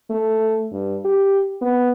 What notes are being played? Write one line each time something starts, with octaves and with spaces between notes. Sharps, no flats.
A3
G2
G4
B3